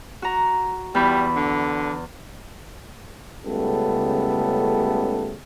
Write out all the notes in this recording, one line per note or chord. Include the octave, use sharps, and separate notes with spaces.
F#4 A#5
E2 G3 B5
D3
C#2 C#3 G3 A3 B3 A4